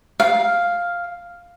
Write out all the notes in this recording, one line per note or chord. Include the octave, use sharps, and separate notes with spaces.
F5